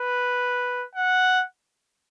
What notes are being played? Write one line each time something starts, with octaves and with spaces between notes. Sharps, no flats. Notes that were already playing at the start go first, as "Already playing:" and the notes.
Already playing: B4
F#5